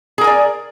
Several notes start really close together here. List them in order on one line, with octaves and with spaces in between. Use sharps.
G#4 A#4 G#5 D5